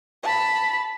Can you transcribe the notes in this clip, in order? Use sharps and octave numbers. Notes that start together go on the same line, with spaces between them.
A5 B5